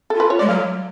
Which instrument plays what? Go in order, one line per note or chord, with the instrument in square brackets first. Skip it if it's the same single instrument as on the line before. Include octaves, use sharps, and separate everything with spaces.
[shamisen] A4
[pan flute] F4 [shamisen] B4
[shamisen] C#5
[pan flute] G#3 [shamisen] D5
[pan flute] F#3 [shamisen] F5